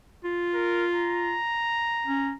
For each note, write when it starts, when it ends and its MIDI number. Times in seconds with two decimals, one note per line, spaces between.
0.24 1.37 65
0.55 0.87 70
0.95 2.35 82
2.06 2.32 61